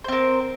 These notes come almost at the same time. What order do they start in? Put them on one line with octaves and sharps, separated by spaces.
C5 C4 A#4